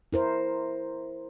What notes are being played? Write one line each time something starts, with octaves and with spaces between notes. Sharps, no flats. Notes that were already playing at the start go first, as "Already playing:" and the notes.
E4 A#4 C5